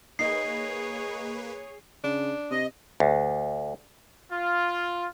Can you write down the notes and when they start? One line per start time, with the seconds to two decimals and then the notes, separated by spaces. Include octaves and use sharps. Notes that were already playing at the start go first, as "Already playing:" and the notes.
0.19 A#3 D#4 G#4 B4 C#5 C7
2.04 C#3 D4
2.51 C3 D#5
3.00 D2
4.32 F4